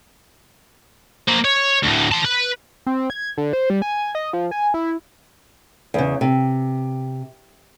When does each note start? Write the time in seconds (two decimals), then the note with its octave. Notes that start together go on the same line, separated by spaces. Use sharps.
1.28 A#3 C5
1.45 C#5
1.83 D2 A2
2.12 A5 C6
2.25 B4
2.86 C4
3.10 G#6
3.38 D3
3.53 C5
3.70 G3
3.82 G#5
4.15 D#5
4.33 F3
4.51 G#5
4.74 E4
5.94 E2 C#3
6.21 C3